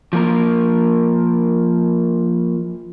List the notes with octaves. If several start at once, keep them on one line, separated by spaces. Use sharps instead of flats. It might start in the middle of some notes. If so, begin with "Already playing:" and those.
F3 A#3 A#4